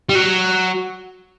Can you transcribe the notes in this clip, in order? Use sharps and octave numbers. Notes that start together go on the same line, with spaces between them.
G3
F#3